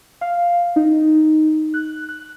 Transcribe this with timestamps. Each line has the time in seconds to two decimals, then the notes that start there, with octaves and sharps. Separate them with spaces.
0.21 F5
0.76 D#4
1.74 F#6
2.09 F#6